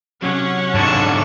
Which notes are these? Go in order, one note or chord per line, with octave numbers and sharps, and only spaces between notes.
C3 F#3 C#4 F#5
G#2 D3 A5 C#6